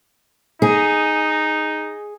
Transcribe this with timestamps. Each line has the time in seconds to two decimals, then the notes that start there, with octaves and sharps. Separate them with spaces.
0.62 D#4 G#4